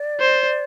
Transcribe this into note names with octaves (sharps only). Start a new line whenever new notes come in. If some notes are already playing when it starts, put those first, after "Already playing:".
Already playing: D5
C5